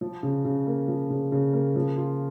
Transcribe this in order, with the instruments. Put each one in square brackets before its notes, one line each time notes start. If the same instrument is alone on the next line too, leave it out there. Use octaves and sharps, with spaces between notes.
[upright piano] F3
C#3
C#3
A#3
F3
C#3
C#3
A#3
F3
F4